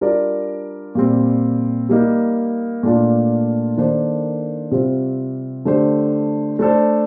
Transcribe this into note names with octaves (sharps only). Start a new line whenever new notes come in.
G3 D4 F4 A#4 D5
A#2 G3 C4
G3 A#3 D#4
A#2 A3 D4 F4
D#3 A#3 D4 A4 C5
C3 G3 C4 F4 C5
D3 A3 D4 G4 C5
A3 D4 A4 C5